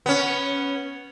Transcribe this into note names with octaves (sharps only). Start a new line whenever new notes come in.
B3 C#4